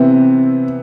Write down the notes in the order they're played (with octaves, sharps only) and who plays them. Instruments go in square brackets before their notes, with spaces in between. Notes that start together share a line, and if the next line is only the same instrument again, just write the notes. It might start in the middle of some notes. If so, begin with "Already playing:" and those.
Already playing: [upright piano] C3 E3 B3 E4 [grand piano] C4